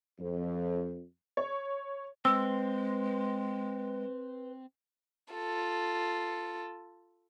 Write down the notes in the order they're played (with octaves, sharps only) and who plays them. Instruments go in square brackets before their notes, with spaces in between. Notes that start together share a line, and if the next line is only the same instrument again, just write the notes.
[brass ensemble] F2
[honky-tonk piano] C#5
[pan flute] G#3 [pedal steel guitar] C4 [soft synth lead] B4 [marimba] E6
[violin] F4 A4